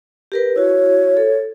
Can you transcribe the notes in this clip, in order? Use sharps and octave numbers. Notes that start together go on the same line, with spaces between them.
G4 A#4 B4
E4 F#4 C#5
A4